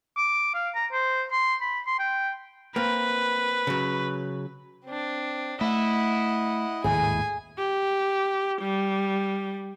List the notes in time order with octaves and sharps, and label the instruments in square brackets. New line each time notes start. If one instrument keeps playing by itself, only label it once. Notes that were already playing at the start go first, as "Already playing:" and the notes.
[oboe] D6
F5
A#5
C5
C6
B5
C6
G5
[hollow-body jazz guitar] A#3 C4 [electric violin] B4
[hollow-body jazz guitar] C#3 F#3
[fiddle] C4 D4
[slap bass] A3 [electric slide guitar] E4 [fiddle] D#5 F#5
[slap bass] G#1 D#2 A2 [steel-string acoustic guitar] G#4 [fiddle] G#5
[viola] G4
G3